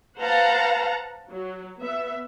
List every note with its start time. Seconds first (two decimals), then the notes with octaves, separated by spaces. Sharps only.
0.20 B4 C5 F5 F#5 A5 A#5
1.30 F#3
1.79 B3 E5